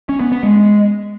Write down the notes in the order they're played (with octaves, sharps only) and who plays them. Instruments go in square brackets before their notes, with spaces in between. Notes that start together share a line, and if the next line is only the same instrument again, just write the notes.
[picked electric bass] C#4
B3
B3
G#3